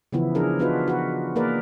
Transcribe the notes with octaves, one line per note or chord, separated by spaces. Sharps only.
C#3 E3 F3 B3 E4
F3 D4 G#4 A#4
B3 D4 D#4 F4 F#4 B4
F#4 B4
A#3 G#4 A#4 B4 D5